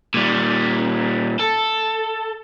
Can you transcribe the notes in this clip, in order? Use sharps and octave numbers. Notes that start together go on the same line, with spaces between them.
A#2 G3
A4